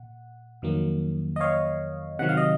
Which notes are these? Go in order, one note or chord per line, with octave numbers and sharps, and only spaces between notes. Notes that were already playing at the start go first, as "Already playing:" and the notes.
Already playing: A#2 F#5
F2 D#3 F#3 A#3
D#5
C#5 F5
C3 D#3 F#3 F#5
F5
D#5